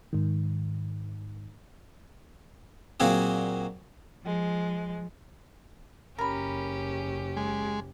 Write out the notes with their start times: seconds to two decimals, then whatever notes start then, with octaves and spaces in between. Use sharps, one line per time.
0.13 G#2 D#3
3.00 A#2 F#3 A#3 C4 F#4 G#4
4.24 F3 G#3
6.18 F#1 C#4 G4 A#4 B5
7.37 G#3